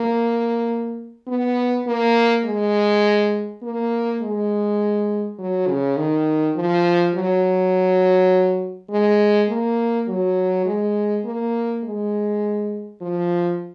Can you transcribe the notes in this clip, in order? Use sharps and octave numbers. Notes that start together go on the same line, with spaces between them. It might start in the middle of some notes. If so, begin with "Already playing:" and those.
Already playing: A#3
B3
A#3
G#3
A#3
G#3
F#3
C#3
D#3
F3
F#3
G#3
A#3
F#3
G#3
A#3
G#3
F3